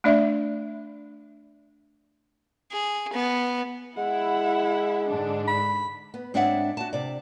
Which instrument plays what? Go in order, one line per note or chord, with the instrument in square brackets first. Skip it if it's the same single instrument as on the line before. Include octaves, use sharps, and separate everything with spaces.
[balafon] A3 D4 D5 E5
[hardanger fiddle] G#4
B3
[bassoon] G#3 [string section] E4 [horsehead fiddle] F#5
[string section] G#2 D3 D4
[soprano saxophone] B5
[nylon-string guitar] B3
G#2 C4 D4 C#5 E5 F#5
F#4 A5
C3 D5